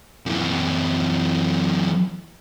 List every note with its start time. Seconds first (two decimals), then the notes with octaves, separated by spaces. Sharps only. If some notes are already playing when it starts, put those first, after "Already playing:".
0.26 F#2 E3